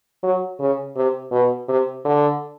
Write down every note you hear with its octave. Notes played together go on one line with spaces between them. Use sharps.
F#3
C#3
C3
B2
C3
D3